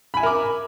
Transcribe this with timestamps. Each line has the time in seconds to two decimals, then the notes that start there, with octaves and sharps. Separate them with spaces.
0.14 B5
0.17 G#5
0.20 E5
0.23 A#4
0.26 D6